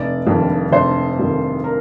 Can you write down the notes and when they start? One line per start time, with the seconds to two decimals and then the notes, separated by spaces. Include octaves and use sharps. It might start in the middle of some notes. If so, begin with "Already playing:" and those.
Already playing: F1 D5
0.26 F2 D#3 G3 A#3
0.71 F1 C5
1.18 F2 D#3 G3 A#3
1.64 A#4